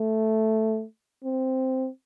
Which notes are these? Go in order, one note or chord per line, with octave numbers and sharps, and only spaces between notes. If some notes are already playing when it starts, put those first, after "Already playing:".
Already playing: A3
C4